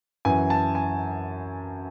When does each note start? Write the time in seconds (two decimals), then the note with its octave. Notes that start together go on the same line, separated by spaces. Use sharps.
0.25 F#2 E3 G#5
0.50 A5
0.75 G#5